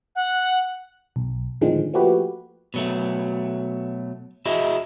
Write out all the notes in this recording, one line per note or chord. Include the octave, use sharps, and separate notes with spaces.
F#5
B1
A2 D3 D#3 F3 G#3 C4
F3 A3 A#3 F#4 G4 B4
B2 F#3 A3
E4 F#4 G#4 D#5 E5